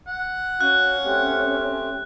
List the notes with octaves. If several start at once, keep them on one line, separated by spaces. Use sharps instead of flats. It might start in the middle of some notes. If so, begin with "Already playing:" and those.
F#5
C#4 F#4 F5 F#6
A3 C4 G4